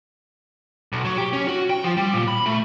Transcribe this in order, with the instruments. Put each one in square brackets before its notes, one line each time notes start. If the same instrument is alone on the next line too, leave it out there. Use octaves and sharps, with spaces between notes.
[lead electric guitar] B1
F#3
G4
C#4
F#4
G5
F3
G3
A#2
B5
A3